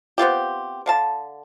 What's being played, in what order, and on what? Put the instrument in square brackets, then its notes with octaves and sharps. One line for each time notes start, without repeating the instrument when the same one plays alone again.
[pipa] B3 C4 F4 G4
D3 F5 A5